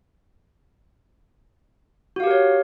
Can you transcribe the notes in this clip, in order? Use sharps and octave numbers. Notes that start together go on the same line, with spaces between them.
F#4 G4 A#4 C#5 F5